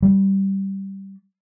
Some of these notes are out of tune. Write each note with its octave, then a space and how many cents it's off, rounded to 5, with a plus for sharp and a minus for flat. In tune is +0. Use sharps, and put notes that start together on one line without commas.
G3 -10